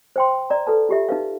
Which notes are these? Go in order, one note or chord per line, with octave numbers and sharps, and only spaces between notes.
C5 G5 C6
D5 A#5
A4 B4 A5
F4 G4 E5
D#4 B4 F5